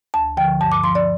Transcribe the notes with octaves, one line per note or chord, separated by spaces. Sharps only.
D2 A5
D3 F3 G5
G2 A5
D6
F3 C6
D5